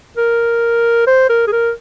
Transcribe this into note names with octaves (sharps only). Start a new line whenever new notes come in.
A#4
C5
A#4
G#4
A#4